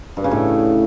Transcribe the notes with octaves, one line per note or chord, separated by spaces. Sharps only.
G2
C#3
A2